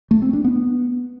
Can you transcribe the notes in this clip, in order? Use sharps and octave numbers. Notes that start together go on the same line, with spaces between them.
A3
C4
D4
B3